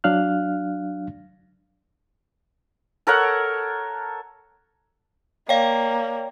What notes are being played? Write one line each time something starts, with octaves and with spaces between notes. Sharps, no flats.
F#3 D4 F5 F6 F#6
A4 A#4 C#5 F#5
A#3 C#5 D5 F5 G5